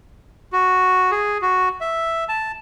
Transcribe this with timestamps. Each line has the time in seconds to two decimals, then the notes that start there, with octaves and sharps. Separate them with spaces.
0.53 F#4
1.11 G#4
1.42 F#4
1.81 E5
2.29 A5